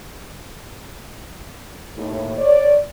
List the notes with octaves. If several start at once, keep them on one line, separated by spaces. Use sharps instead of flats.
D#2 A2
C#5 D5